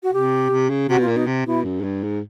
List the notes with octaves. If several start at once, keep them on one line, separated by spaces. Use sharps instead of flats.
F#4
C3 G4
C3
C#3
C3 F#4
B2 F4
A#2
B2 D#4
C3
B2 E4
F#2
G#2
G2
G#2